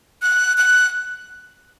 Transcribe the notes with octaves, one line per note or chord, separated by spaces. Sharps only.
F#6
F#6